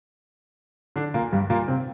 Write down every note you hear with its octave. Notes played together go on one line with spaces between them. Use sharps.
D3 D4
A#2 A#3
G2 G3
A#2 A#3
C3 C4